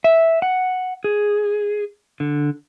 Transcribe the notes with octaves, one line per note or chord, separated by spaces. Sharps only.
E5
F#5
G#4
D3